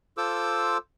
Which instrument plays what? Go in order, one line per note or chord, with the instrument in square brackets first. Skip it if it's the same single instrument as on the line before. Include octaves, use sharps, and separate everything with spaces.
[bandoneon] F4 A4 C5 D6 E6